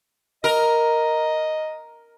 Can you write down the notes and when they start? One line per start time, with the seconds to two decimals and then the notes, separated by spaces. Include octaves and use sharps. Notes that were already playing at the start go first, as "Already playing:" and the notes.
0.44 A#4 D#5